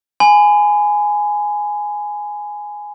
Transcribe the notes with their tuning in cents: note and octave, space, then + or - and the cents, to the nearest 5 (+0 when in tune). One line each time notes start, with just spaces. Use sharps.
G#5 +0 B5 +35